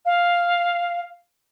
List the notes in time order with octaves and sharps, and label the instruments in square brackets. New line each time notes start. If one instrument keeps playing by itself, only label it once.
[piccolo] F5